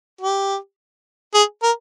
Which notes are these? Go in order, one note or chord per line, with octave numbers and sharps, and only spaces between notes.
G4
G#4
A#4